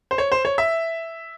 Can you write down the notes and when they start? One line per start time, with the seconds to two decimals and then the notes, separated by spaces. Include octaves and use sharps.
0.11 C5
0.18 C#5
0.32 C5
0.45 C#5
0.58 E5